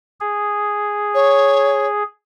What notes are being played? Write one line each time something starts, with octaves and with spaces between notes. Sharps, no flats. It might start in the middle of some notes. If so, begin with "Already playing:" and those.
G#4
C#5